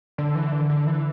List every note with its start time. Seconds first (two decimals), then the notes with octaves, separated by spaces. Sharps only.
0.18 D3
0.35 E3
0.52 D3
0.70 D3
0.87 E3